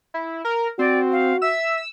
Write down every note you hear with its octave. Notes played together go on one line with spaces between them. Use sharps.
E4
A#4
C4 F#4 D5
F5
E5 E6